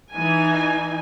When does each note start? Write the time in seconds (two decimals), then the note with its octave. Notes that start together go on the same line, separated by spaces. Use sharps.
0.12 E3 D#4 G#5